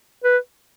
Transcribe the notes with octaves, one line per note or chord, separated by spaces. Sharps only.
B4